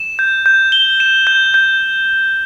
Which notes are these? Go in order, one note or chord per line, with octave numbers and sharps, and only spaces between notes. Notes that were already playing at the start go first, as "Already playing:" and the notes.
Already playing: E7
G6
G6
G7
E7
G6
G6